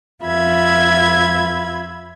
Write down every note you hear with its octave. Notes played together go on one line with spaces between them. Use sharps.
F2 F4 E5 B5 G#6